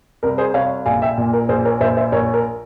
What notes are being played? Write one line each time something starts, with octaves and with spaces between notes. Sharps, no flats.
C2 A#4
G#4 C5
C2 C#5 F5
A#1 F5 G#5
E5 G5
A#2
A#4
A#1 G#4 C5
A#4 C#5
A#1 C5 E5
C5 E5
A#1 A#4 C#5
A#4